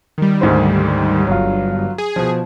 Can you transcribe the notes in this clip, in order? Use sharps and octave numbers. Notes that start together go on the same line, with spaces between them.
D#3 G3
D2 G#2 C5
G1 G2 F#3 F4
G#4
B2 F3